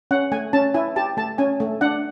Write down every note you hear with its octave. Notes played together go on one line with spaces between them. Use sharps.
C#4 F#5
A3 G#5
C#4 A5
E4 G#5
G4 A5
A3 A5
C#4 G#5
A3
D4 F#5